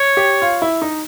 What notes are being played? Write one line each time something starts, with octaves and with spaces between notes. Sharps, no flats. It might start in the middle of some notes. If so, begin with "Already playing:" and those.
Already playing: C#5
G4
F4
E4
D#4